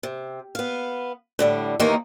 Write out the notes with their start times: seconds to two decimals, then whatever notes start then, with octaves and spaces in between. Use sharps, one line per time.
0.03 C3
0.55 B3 F5
1.39 A2 D3 G3
1.80 D#2 D#3 E3 A#3 D#4